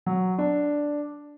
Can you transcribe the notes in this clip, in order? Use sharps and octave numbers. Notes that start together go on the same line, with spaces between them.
F#3
D4